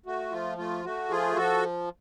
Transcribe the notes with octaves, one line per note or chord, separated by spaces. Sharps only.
A3 F#4
F3 F4
A3 F4
A3 F#4
F3 F4 G#4
F3 F#4 A4